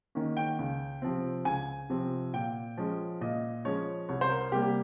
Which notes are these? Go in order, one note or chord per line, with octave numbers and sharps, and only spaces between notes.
D#3 A#3 C#4
G5
C#2
C3 F3 C4
C#2 G#5
C3 F3 C4
A#2 G5
F3 G#3 C#4
A#2 D#5
F3 G#3 C#4 C#5
C2 C#5
C5
A#4
C3 G3 A#3 G4